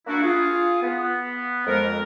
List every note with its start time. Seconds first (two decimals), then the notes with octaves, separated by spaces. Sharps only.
0.07 A#3 D4 E4 F#4
0.23 F4 G#4
0.82 B3
1.67 F2 G#3 A#4